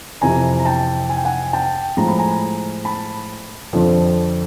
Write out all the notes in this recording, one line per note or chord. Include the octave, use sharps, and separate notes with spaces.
F2 C3 E3 G#5 A#5
A#5
G5 A5
G#5
G5
F#5 G#5
G5 A5
A2 F3 G#3 A#5
B5
G#5 A#5
A5 B5
F2 D3 F3